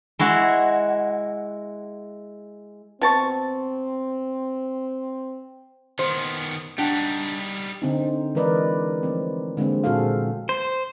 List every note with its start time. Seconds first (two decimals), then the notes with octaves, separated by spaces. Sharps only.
0.19 G#3 E4 F#4
3.02 B2 C4 A5 C#6
5.99 D#3 B3 C5
6.78 G3 D4 D#4 F#5 G5
7.82 D3 C4 D#4
8.35 E3 G#3 A#4 B4 D5 D#5
9.03 F3 A3 C4
9.57 D3 G#3 A#3 C4
9.84 A#2 F#4 G#4 A4 C5 F5
10.49 C5